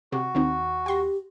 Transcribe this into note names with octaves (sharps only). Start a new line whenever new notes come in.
C3 F#4
D#2 D#3 C4 D#4
G4 G5 C6 A#6